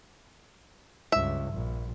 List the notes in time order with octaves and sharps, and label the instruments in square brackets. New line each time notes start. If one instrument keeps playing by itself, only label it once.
[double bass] C#2 G2 [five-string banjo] E5
[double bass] A#1